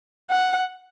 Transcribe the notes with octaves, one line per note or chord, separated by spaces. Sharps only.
F#5